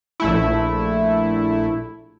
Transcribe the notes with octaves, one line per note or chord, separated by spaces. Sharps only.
A#1 A3 E4